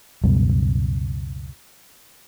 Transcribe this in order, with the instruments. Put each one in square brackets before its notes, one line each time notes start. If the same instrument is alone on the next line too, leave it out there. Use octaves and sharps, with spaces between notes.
[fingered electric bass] C#2 F#2 B2 G3